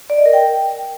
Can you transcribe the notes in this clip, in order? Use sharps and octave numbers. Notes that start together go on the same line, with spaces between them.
D5
D#5
A#4
G5